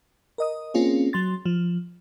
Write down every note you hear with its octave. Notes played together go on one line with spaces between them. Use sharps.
A#4 D#5 D#6
A#3 C4 C#4 F4 G#4
F#3 C6 A6
F3